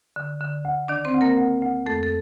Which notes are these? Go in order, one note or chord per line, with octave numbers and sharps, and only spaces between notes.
D3
D3
D2
D#3 D4 D5
C4 C5
D2
A#3 A#4
D2
D2
F2 A3 A4
A4